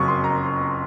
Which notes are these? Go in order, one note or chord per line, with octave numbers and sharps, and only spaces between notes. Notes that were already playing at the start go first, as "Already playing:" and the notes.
Already playing: F#1 F2 C#3 F#3 C#6 D#6
C6
A#5